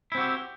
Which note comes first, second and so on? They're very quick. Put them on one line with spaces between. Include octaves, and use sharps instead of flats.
E4 C4 F#4 G4